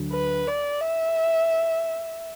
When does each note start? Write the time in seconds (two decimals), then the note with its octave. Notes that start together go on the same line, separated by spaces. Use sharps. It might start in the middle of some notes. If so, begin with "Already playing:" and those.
Already playing: D2 D3 F#3
0.12 B4
0.47 D5
0.81 E5